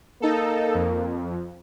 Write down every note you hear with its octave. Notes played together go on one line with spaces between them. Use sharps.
A#3 D#4 A4
F2